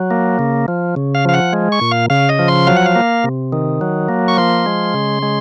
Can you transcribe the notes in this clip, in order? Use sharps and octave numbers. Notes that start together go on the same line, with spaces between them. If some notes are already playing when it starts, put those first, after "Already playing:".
Already playing: F#3
A#3
C#3
F3
C#3
F5
F3 F5
F#5
G#3
C#6
A#2
F5
C#3 F5
D#5
F3
C6
F#3 F5
F#5
F5
A#3
C3
D#3
F#3
A#3
C#6
F3 C6
G#3
C#3
G#3